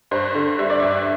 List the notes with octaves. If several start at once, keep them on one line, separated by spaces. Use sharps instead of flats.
G2 C5
D3
G3 E5
D5
G2 E5